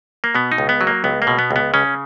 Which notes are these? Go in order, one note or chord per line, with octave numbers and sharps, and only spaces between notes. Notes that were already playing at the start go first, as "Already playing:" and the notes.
A#3
B2 B3
D#4
C#2
B3
F#3
A#3
C#2 B3
A#3
B2
B3
C#2
B3
C#3 C#4